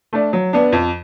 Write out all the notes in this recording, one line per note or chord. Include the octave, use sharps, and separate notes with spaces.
A3 D4
F#3
B3 D4
F2